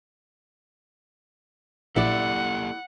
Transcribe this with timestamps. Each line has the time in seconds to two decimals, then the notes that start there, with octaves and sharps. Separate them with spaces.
1.96 A#1 A#3 E4 G4 A4 D5 F#5